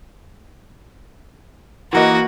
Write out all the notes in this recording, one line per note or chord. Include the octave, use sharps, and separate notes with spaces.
E3 A#3 F#4 D#5